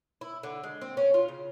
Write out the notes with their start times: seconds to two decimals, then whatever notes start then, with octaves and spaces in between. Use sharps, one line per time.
0.21 E4
0.43 D3
0.63 G#3
0.81 C4
0.97 C#4
1.14 F4
1.28 C#3